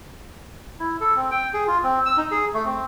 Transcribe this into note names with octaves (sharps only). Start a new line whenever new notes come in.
E4
A4
C4
G5
G#4
F4
C4
E6
D#4
G#4
A3
C4